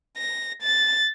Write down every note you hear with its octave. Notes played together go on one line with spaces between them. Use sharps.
A#6
A6